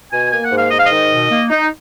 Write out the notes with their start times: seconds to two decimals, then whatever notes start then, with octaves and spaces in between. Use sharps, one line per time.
0.12 B2 G#5
0.31 A#3 G#5
0.45 F#5
0.52 G#2
0.58 F5
0.71 G#2 D#5
0.79 F5
0.86 D#3 D#5
1.11 B2
1.30 A#3
1.50 D#4